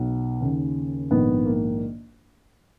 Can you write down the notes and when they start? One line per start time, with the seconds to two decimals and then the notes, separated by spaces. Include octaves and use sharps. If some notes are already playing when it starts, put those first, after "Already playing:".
Already playing: B1 B2
0.41 D#2 C#3
1.10 A#1 G#2 D#3 B3
1.45 A#3